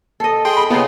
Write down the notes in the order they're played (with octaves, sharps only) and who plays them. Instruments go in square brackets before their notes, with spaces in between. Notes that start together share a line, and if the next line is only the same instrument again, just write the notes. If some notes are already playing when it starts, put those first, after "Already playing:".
[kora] A4 D#5
[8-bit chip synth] G#4 G5 C6
[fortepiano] B5
[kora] C#3 D#4 F4 [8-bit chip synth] B3